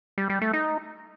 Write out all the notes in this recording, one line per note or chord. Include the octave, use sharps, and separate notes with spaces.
G3
G3
A3
D#4